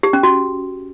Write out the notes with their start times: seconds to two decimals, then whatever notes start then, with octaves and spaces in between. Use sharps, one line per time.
0.03 G4
0.13 C#4
0.23 F#4